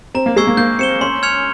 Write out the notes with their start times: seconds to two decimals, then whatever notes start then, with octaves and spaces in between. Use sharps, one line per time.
0.15 C4 A#5
0.26 A#3
0.36 G#3 C#6 E6 G#6 C7
0.47 A#3
0.57 A#3 G6
0.79 C4 C#7 E7 G7
1.01 C#4 C6
1.23 F6 G#6 C#7 F7